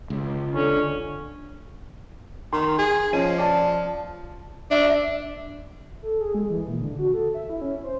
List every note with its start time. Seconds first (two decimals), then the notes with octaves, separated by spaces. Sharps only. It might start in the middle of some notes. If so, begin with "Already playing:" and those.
0.10 C#2
0.55 D3 C#4
2.53 D#3 C6
2.78 G#4
3.13 F3 C#4 D#5 D#7
3.38 D5 A5
4.71 D4 E5
6.02 A4
6.21 G#4
6.34 G#3
6.50 E3
6.67 A#2
6.80 D3
6.99 F#4
7.14 A4
7.34 E5
7.50 E4
7.61 C#4
7.83 C5